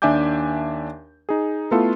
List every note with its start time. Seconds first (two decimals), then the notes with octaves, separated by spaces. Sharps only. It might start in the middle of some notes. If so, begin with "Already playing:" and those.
0.02 D#2 D4 E5 G#5 D6 G6
1.29 D#4 G#4
1.71 A3 B3 E4 F4 A4